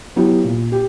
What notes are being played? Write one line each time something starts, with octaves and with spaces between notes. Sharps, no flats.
F#3 B3 E4 G4
A#2
G4